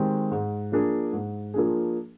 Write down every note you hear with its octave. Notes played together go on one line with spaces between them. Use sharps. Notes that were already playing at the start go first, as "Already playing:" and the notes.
Already playing: D#3 G#3 C4 G4
G#2
F3 A#3 D4 G#4
G#2
F3 A#3 D4 G#4